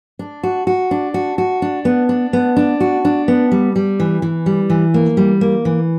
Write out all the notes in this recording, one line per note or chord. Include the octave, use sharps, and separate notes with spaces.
D4
F#4
F#4
D4
F#4
F#4
D4
B3
D4
B3
D4
F#4
D4
B3
G3
G3
E3
E3
G3
E3
A#3
G3
A#3
E3